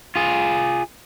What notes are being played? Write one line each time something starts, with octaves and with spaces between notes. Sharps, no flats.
F4 G#4